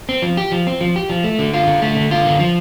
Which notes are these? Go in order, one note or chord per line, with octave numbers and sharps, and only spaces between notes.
C4
F3
G4
F3
C4
F3
G4
F3
A3
D3
F4
D3
A3
D3
F4
D3
F3